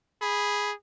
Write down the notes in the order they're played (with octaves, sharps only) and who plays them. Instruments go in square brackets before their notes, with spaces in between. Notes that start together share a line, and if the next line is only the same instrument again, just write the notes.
[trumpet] G#4 [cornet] B5